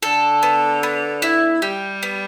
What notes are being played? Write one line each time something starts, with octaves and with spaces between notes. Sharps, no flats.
D3 A4
B3
B3
E4
G3 G4
B3